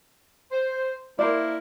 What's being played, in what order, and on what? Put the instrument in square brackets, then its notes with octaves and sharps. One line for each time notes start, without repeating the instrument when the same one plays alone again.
[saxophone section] C5
[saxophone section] A#3 E4 [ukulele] A#4 C5 D5